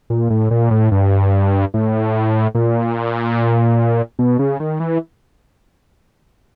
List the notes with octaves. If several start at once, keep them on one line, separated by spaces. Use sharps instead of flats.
A#2
A2
A#2
A2
G2
A2
A#2
B2
C#3
D#3
E3